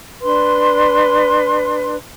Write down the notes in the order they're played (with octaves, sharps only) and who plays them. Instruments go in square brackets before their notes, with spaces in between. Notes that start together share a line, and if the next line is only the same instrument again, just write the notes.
[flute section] D4 B4 C6